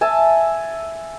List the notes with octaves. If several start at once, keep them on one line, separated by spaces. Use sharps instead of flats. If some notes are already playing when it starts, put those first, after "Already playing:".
E5 G#5 A5